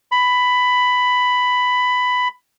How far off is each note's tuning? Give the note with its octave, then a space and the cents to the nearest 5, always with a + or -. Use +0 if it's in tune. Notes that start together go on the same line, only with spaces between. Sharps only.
B5 +10